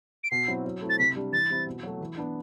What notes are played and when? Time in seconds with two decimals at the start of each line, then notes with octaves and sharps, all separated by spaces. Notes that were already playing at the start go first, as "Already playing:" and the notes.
0.24 D7
0.31 B2 C7
0.48 F#3 C4 E4
0.65 F#3
0.82 A3 C4 E4
0.90 A6
0.99 C3 B6
1.16 G3 D4
1.32 E3 A6
1.50 G3 C4 E4
1.66 B2
1.83 F#3 A3
2.01 E3
2.17 B3 D4